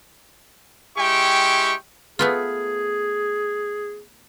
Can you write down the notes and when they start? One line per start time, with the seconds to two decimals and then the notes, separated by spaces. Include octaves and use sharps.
0.98 G#3 E4 G4 G5 C#6
2.19 A3 B3 F4 G#4